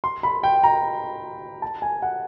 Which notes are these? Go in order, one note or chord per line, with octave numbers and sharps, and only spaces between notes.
C6
B5
G5
A#5
A5
G#5
F#5